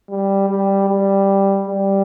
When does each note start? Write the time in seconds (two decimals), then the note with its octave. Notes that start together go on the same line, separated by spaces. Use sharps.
0.09 G3
0.49 G3
0.89 G3
1.68 G3